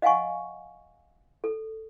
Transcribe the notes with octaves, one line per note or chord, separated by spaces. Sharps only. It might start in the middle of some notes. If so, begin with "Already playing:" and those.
D#5 F5 F#5 G#5 C#6
A4